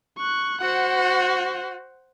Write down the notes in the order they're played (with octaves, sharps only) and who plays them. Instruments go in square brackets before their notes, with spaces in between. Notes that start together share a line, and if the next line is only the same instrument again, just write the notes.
[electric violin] C#6 F#6
[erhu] F#4 [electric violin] C5 F#5